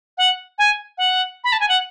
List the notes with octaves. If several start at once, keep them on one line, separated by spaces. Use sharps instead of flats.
F#5
G#5
F#5
B5
A5
G#5
F#5